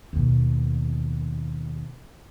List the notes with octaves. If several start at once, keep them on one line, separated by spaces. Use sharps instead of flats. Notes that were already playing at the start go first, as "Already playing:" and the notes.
D#2 B2